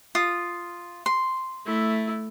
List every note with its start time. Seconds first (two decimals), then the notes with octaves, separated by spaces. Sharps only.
0.15 F4 D#6
1.06 C6
1.66 A3 E4